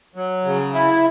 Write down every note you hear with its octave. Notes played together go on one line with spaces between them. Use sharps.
F#3
C#3
E4